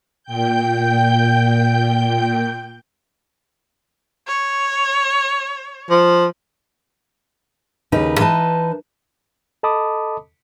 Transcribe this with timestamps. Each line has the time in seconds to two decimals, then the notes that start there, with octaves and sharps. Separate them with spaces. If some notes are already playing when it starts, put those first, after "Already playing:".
0.23 A#2 G5 G6
4.28 C#5
5.90 F3
7.92 D#2 C#3 D#4 B4
8.19 E3 D#4 B4 A5
9.63 A4 D#5 A5 B5 D6 D#6